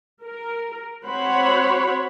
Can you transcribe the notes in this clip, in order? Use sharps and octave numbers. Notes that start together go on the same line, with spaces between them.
A#4
C4 F#4 C5 C#5 F#5 B5